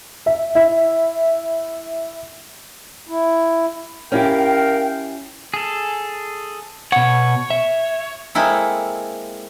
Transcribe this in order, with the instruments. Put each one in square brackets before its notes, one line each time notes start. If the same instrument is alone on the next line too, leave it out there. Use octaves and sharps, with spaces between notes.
[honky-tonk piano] E5
E4
[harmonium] E4
[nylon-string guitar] C#4 E4 G4 [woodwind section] A#4 F5 G5
[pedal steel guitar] G#4 A4
[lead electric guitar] B2 F#5 [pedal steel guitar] C#5
[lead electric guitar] E5
[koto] G#3 A#3 C4 E4 A4